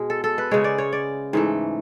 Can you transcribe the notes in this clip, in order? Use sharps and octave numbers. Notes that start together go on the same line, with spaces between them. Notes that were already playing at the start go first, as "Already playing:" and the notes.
Already playing: B2 G#3
A4
A4
B4
C#3 G#3 C#5
D5
C#5
D5
G#2 E3 A3